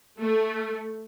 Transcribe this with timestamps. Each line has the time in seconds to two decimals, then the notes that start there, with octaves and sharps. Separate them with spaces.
0.19 A3